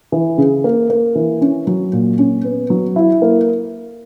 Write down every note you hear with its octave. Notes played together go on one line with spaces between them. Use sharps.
E3
C#3
A#3
A#3
E3
C#4
F#3
A#2
C#4
B3
F#3
E4
A#3